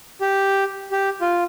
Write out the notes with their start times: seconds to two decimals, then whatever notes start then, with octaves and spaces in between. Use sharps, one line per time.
0.21 G4
0.92 G4
1.21 F4